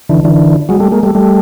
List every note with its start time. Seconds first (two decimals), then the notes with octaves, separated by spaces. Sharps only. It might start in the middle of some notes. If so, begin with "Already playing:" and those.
0.09 D3 E3
0.25 D3 E3
0.69 F#3 G#3
0.80 G3 A3
0.91 G#3 A#3
1.03 G3 A3
1.15 G3 A3